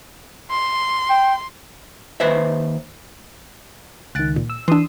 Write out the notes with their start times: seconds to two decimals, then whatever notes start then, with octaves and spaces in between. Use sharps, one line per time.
0.51 C6
1.10 G5
2.20 D#2 B4 C5 E5
4.15 C#2 D#3 F#6 A6 D7
4.36 A#2
4.50 E6
4.68 E3 D4 C6 D#6 E6